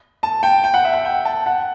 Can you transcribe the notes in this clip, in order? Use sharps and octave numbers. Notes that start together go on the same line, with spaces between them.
A5
G5
G5
F#5
E5
F#5
G5
A5
F#5